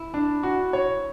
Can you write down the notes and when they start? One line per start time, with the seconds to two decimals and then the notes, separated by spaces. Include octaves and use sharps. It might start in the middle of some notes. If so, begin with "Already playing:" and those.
Already playing: E4
0.14 D4
0.43 F#4
0.73 C#5